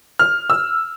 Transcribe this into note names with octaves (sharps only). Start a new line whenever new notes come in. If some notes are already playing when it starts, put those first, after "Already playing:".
F6
E6